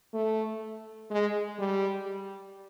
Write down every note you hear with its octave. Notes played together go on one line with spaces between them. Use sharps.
A3
G#3
G3